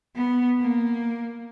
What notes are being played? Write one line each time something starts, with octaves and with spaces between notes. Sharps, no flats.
B3
A#3